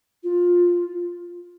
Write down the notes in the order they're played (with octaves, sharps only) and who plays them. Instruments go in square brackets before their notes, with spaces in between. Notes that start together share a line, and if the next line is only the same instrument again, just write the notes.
[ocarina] F4